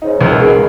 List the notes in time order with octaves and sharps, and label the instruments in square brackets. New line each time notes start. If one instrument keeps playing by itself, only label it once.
[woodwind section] G#2 C#3 [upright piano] D#4
[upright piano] C#2 [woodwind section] F#3
[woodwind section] B2 D#3
[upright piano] G#3
[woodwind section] C#3